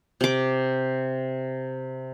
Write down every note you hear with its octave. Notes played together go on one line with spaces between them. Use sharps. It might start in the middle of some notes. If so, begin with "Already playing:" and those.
C3 D6